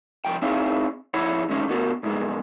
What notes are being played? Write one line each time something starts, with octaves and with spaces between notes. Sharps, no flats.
C2 F3 G5
C4 D#4 E4 G#4 C#5 F5
F2 E4 C#5 F#5 B5
G2 D3 D#3 G#3 C#4 D#4
B2 D3 B3 F#4 A#4
C2 G#2 G#3 B3